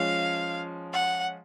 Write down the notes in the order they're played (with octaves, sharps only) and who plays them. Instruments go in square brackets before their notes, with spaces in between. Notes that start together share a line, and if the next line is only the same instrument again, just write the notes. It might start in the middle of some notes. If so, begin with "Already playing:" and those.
Already playing: [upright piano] F3 G#3 C#4 [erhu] F5
[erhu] F#5